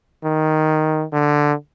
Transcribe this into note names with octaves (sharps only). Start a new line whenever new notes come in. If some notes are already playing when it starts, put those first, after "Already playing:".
D#3
D3